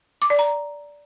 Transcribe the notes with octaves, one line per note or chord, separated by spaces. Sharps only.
D6
D5
A#5